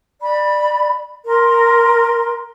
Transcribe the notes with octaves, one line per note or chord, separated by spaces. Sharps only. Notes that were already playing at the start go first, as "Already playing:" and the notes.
D5 B5
A#4 C6